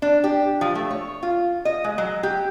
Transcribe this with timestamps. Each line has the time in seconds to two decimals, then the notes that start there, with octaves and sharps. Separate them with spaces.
0.02 D4
0.24 G4
0.61 F3
0.75 A3
0.91 C#5
1.23 F4
1.65 D#5
1.84 G#3
1.98 F#3
2.23 G4